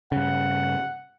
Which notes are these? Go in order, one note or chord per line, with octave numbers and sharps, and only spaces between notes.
G2 C#3 F#5